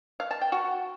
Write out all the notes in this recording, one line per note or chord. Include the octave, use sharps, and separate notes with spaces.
F5
A5
G5
F#4